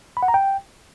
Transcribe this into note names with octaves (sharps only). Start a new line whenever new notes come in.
B5
F#5
A#5
G5